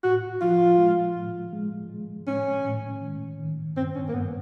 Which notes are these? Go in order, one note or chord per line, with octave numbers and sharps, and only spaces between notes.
A2 F#4
F3 F4
G#3
A2
G#3
G#3
A2 C#4
A2
D#3
D#3
G2 C4
C#4
A#3
G2 B3